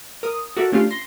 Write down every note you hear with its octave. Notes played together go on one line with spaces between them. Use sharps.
A#4 D#6
F#4 A4 A#4 D5 E5
A3 C#4 D4 F4 G4 F5
C6 A#6